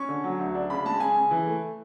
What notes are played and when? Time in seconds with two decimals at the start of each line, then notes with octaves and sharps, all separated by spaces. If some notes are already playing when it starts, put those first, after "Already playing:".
Already playing: C#4 C#6
0.09 D3
0.24 F#3
0.39 D2
0.55 D4
0.70 C#3 B5
0.85 G#3 A5
1.00 C#3 G#5
1.16 C#3
1.31 E3
1.46 A3